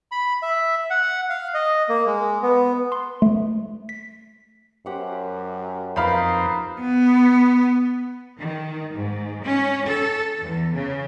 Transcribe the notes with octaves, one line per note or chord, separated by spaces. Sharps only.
B5
E5
F#5
F5
D#5
A#3
G#3
B3
C6
A3
B6
F#2 G4 C5 F#5
F2 A#3 C4 D#4 B4 F5 B5
B3
D#3
G#2
C#4
A4
E2
C#3